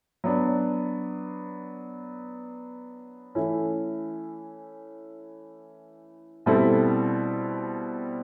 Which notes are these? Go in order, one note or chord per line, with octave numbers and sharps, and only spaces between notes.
F#3 B3 D4
E3 A3 C#4 E4
B2 G3 C4 E4 A4